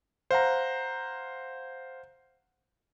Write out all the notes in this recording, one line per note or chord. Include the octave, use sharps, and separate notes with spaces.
C5 F5 F#5 A#5